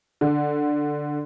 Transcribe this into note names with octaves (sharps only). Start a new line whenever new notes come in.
D3